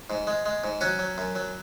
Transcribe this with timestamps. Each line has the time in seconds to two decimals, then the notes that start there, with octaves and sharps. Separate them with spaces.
0.10 G#2
0.27 G#3
0.46 G#3
0.64 G#2
0.81 F#3 C#4 F#4
0.99 F#3
1.18 F#2
1.36 F#3